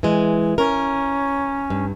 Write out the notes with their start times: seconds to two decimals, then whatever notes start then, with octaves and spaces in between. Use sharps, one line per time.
0.03 E3 G#3
0.58 C#4 A#4
1.70 G2